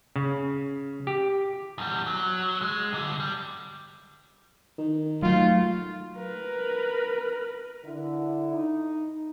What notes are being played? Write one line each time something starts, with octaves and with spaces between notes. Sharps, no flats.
C#3
G4
E2 G3
F#3
G#3
G2 D3
G3
D#3
F#3 A3 F4
A#4 B4
D3 E4
D#4